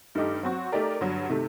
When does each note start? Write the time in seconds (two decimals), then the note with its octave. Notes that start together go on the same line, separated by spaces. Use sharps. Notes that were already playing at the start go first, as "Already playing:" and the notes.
0.15 G2 D#3 A3 D#4 G4
0.43 F#3 C4 F#4
0.72 A3 D#4 G4 A#4 D5
1.01 G2 D3 F#3
1.29 C3 D#3 A3